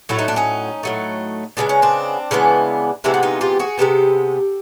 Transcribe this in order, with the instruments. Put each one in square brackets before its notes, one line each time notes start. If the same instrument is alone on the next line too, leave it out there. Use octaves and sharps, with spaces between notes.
[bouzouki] A2 F#3 A3 E4
D#4
D4
C#4 D#4
A2 F#3 A3
C#3 E3 G#3 B3 D4
C#4
C4 D4
C#3 E3 G#3 B3
C3 E3 G#3 B3 D4 E4
F#4
D#4 F4
F4 G4
F#4 G#4
C3 E3 G#3 B3 G4 A4